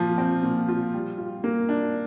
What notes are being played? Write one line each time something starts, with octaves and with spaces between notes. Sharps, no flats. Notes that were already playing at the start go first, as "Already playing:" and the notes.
Already playing: A#2 F3 F4
C4
A#2
F4
G3
F4
A#3
D4